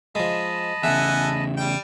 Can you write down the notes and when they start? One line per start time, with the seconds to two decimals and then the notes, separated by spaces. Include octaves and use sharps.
0.15 F3 G#3 D#5 A5 B5
0.83 E2 C#3 A4 E5 F#5 G#5
1.57 G3 G5